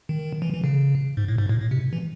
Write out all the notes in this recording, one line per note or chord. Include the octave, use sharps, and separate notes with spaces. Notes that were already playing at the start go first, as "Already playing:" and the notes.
D#3
E3
E3
C#3
G#2
A2
G#2
A2
A2
C3
E3